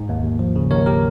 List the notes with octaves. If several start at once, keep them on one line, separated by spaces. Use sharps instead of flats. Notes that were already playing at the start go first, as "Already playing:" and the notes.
Already playing: G#2
D#2
D#2
F3
C#3
D#2 A#4 C#5
G4 A#4